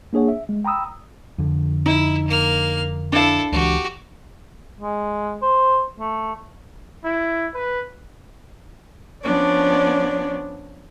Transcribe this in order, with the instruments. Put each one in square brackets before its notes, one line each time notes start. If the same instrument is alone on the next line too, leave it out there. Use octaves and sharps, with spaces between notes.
[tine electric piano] A#3 D4 G#4 C#5 F#5
E5
G#3
G5 A#5 B5 D#6 E6
[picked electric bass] F2 D3
[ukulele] D#4 [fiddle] E4
[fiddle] A#3 F6
[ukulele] D4 F5 [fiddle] E4 A4
[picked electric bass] C#2 E3 [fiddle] F#4 G4
[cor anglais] G#3
C5
A3
[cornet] E4
B4
[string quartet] F3 B3 C#4 D4 C#5 D5